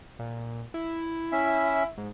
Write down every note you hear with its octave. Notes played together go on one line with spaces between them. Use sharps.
A#2
E4
C#4 E5
G#2